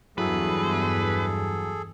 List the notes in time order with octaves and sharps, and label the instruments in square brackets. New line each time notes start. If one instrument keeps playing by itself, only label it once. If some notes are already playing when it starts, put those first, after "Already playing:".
[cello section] E2 G2 [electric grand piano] F#3 E4 [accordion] G#4 A4 [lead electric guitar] B4